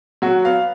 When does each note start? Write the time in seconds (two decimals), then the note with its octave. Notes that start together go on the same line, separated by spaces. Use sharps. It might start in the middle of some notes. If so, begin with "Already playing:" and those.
0.22 F#3 F#4
0.45 B3 F5